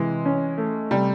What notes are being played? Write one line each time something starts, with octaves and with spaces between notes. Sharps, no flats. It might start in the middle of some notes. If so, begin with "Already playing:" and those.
Already playing: C3 E3 G#3
C#4
A3
C3 G3